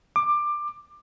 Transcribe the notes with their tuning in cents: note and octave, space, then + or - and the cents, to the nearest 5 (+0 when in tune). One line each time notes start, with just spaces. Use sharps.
D6 +20